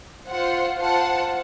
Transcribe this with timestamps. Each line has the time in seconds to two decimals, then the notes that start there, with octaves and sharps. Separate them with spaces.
0.27 F4 C5 F#5
0.79 F4 C5 F#5 A5